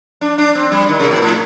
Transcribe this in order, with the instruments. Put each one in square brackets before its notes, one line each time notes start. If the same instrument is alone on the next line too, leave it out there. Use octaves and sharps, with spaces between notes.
[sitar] D4
D4
C4
G3
D#3
C3
A#2
A2